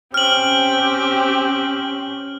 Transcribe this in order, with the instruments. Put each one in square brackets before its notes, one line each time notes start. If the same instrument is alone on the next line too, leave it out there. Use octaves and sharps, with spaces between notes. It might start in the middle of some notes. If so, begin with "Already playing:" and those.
[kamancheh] C4 G4 [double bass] C#4 [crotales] F6 F#7